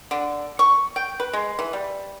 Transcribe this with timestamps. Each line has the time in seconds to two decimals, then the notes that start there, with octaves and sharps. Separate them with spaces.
0.11 D3
0.59 C#6
0.96 G5
1.20 B4
1.33 G#3
1.59 E3
1.73 G3